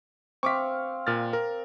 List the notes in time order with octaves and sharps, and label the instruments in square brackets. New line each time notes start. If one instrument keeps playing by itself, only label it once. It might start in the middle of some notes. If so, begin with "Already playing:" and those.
[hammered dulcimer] C4 F5 [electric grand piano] C#6 D6 B6
[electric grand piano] A#2 F6 A6
A#4